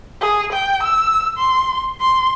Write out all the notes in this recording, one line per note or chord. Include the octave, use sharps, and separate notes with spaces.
G#4
G5
E6
C6
C6